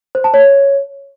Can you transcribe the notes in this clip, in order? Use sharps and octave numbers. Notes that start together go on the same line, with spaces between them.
C5
A5
C#5